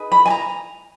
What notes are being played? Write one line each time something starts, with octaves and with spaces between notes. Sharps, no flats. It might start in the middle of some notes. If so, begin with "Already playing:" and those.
Already playing: D#4 G#4 B4
B5
G#5
A#5